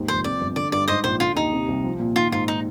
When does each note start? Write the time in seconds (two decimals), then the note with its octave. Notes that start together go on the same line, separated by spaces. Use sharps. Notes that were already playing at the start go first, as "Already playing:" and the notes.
Already playing: D#2 G#2
0.08 F1 C5
0.24 F2 D5
0.41 G1
0.56 D3 D5
0.72 G2 D5
0.88 G#2 C5 D#5
1.04 A#1 C5
1.20 D3 F4
1.36 D#2 D#4
1.53 C3
1.68 C2
1.84 F3
2.00 A#2
2.16 D#3 F4
2.32 G#2 F4
2.48 D#4